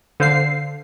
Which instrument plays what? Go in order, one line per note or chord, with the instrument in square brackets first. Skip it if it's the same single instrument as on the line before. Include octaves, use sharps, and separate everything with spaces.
[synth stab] D3 C5 F5 C7